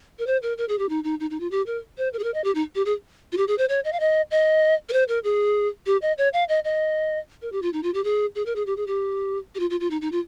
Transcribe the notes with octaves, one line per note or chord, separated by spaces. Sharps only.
A#4
C5
A#4
A#4
G#4
G4
D#4
D#4
D#4
D#4
F4
G4
A#4
C5
A#4
G#4
A#4
D#5
G4
D#4
G4
G#4
F4
G4
G#4
C5
C#5
D#5
F5
D#5
D#5
A#4
C5
A#4
G#4
G4
D#5
C#5
F5
D#5
D#5
A#4
G4
F4
D#4
F4
G4
G#4
G#4
A#4
G#4
G4
G#4
G4
G4
F4
F4
F4
D#4
D#4
F4